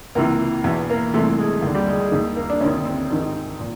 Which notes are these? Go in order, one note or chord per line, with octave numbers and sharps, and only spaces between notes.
C#2 C3 E3 A#3
E2 B2 B3
A#3
C2 C3 E3 A3
G#3
D#2 D3
G3
G#3
G#3
D#2 D#3
A#3
D4
D2 C3 D#3 C#4
C4
A1 G#2 D#3
A#2